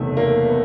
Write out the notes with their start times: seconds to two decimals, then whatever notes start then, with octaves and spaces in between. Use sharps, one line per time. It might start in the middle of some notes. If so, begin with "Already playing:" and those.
Already playing: F#1 E2 C3 D#3 A3
0.17 A#3
0.46 B3